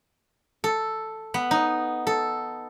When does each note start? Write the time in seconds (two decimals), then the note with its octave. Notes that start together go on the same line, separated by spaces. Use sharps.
0.64 A4
1.34 B3
1.51 D#4
2.07 A4